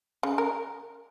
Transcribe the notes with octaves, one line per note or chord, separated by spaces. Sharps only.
C#3
A#4